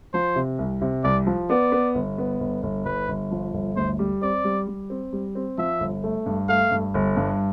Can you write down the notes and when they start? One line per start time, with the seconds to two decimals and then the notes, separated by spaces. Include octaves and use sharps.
0.14 F3 C5
0.36 C3
0.59 C2
0.82 C3
1.04 C2 D5
1.27 F3
1.50 B3 D5
1.72 B3
1.95 G1
2.18 B3
2.40 G1
2.63 G1
2.85 G1 B4
3.08 G1
3.31 F3
3.54 G1
3.76 D2 C5
3.99 G3
4.22 C4 D5
4.44 G3
4.68 G3
4.90 C4
5.13 G3
5.35 C4
5.58 F3 E5
5.80 G1
6.04 A3
6.26 G2
6.49 A3 F5
6.71 G2
6.94 G1
7.17 G2